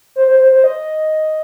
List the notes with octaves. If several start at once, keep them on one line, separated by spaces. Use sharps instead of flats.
C5
C5
C5
C5
D#5